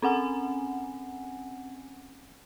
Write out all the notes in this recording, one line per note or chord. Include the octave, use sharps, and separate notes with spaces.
C4 C#4 F#5 G#5